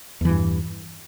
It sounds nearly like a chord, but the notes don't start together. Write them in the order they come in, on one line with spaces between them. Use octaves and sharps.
E2 E3 G2